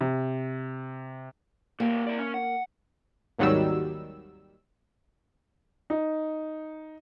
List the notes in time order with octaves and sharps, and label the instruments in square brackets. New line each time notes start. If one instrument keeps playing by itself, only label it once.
[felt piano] C3
[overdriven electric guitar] A#2 G4 [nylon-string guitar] A#3
[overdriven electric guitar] E4 D5
C#4
F#5
[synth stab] G#1 D#2 D#3 F#3 G3 E6
[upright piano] D#4